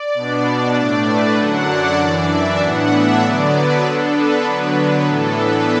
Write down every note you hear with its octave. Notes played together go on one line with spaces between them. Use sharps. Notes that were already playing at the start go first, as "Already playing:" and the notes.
Already playing: D5
B2 B3 D4
A2 A3 D4 D5
B4
F#2 D3 F#3 D4 F#5
D5
F#2 E3 D4 D5
E5
A2 E3 B3 D4 F#5
E5
D3 F#3 B3 D4 D5
B4
D3 B3 D4 A4
B4
D3 F#3 B3 D4 B4
A2 E3 B3 D4 A4
B4